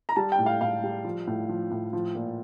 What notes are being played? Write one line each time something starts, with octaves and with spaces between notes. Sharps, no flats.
A#5
G3 A5
G5
A2
F5
A2 F5
G3
F3
A2
F3
A2
F3
A#2